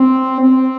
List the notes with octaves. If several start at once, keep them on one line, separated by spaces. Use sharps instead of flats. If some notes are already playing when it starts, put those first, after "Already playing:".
Already playing: C4
C4